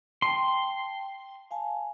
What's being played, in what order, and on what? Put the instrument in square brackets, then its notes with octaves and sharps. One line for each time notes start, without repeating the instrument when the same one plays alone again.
[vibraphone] G5 A5 [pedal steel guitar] C6
[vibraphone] F5 G#5 A5